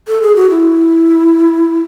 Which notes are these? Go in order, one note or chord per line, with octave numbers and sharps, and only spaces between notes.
A4
G#4
F#4
E4